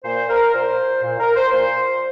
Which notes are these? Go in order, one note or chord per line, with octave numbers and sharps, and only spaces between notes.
A#2 C5
A#4
A#2 C5
A#2
A#4
C5
A#2 C5